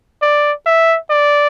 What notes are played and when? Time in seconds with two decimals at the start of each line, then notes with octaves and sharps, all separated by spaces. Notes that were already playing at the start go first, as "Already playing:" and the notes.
0.22 D5
0.66 E5
1.10 D5